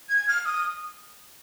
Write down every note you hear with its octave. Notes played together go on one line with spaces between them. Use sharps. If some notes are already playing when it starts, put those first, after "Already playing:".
G#6
F6
D#6